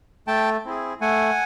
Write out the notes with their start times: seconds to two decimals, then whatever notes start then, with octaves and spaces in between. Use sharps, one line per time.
0.27 A3 G5 A5
0.65 C4 E4 G#4
1.01 A3 F#5 G#5